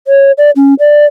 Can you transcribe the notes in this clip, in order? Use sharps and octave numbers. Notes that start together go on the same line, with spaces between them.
C#5
D5
C#4
D5